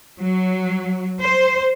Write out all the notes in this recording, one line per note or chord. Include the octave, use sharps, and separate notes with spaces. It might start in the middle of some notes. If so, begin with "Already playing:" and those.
F#3
C5